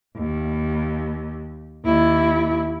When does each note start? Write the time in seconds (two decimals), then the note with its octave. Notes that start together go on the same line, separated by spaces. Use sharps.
0.17 D#2
1.85 D#2 E4